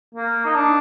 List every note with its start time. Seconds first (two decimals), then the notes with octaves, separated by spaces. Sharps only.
0.15 A#3
0.45 D#4
0.55 D4